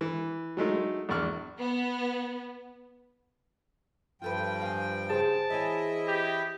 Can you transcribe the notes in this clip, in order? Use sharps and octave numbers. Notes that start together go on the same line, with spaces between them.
E3
F#3 G#3 A3 D#4
A#1 E2 D5 C#6 F6
B3
G2 F3 F4 A4 B4 G5
F5 G#5
C#3 G#4 C5 A5 D7
E3 E4 C#5 D#5 E5 G#5
G4